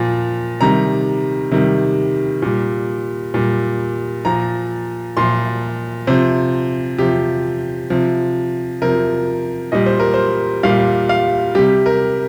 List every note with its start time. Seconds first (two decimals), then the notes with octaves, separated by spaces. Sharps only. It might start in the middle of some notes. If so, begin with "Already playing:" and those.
Already playing: A#2 F3
0.61 C3 D#3 G3 A#5
1.51 C3 D#3 G3
2.42 A#2 G3
3.34 A#2 G3
4.25 A#2 F3 A#5
5.17 A#2 F3 C6
6.07 C3 F3 C5
6.98 C3 F3 G4
7.90 C3 F3
8.82 C3 F3 A#4
9.72 A#2 G3 D#5
9.86 C5
10.00 A#4
10.14 C5
10.63 A#2 G3 F5
11.09 F5
11.55 C3 G3 G4
11.86 A#4